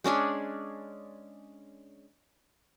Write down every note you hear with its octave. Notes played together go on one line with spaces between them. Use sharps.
G#3 C#4 D4 G#4